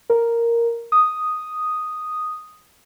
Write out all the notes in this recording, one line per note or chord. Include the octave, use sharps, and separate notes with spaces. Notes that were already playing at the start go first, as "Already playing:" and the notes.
A#4
D#6